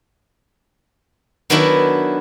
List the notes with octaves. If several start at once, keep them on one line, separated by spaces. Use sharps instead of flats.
D#3 F#3 B3 D4 E4 F#4